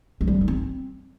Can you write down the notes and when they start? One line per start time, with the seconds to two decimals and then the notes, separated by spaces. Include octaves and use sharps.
0.21 G#3
0.27 G3
0.34 F4
0.41 D#4
0.48 C4